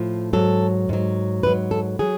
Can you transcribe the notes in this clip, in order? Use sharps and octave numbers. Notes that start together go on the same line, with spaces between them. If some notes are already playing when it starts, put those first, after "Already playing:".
Already playing: A2 F3
G#2 F#3 A4
G#2 F#3
G#2 F#3 B4
A4
F#3 G#4